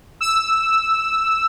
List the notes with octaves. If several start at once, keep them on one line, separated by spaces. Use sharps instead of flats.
E6